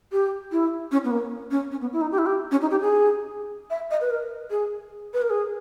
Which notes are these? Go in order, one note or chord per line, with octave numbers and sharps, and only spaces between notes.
G4
E4
C#4
B3
A#3
C#4
C#4
B3
E4
D#4
G4
E4
G4
C#4
D#4
G4
G#4
E5
D#5
B4
A#4
G#4
B4
A#4
G#4